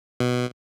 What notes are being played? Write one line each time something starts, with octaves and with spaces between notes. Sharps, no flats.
B2